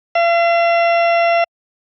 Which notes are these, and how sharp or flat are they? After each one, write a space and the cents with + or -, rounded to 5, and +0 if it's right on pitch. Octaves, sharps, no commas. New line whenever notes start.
F5 -45